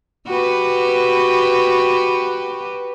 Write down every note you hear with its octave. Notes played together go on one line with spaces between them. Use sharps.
F#4 G4 B4